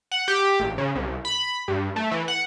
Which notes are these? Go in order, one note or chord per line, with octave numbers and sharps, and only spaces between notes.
F#5
G4
A1
C#3
C2
B5
G2
A3
E3
F#5